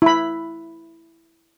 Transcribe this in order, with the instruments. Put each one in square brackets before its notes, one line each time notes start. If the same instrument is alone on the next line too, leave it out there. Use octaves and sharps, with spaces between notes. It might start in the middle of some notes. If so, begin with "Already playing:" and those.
[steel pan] E4 B5